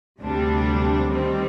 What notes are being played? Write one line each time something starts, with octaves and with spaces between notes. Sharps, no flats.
D2 C3 G3 D4
D#3 G3 C4